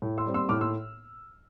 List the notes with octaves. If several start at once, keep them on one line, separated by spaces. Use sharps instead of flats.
A2
C6 E6
G3 C4
C6 E6
A2 D6 F6
C6 E6